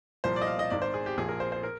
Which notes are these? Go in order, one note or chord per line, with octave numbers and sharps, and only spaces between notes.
C2 A#2 F3 C5
D5
D#5
F5
D#5
G#1 G#2 D#3 D5
C5
G#4
G4
A#1 A#2 F3 G#4
A#4
C5
C5
A#4